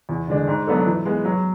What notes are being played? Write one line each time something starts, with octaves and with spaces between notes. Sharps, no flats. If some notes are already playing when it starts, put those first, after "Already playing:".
E2
D3 G#3 D4
G#2
F#3 B3 D4 A4
E3
G#3 B3
F#3